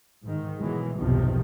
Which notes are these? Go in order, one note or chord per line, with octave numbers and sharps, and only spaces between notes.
G#2 D#3
B2 E3 F#3 G#3
B1 E2 G2 C3 D#3 F3